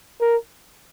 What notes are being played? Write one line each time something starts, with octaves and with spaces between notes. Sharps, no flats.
A#4